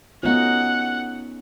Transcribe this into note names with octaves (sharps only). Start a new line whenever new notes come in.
A3 B3 C#4 D#4 F4 F#4 F#5